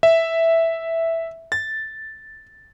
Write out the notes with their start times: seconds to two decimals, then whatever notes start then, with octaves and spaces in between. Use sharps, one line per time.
0.03 E5
1.52 A6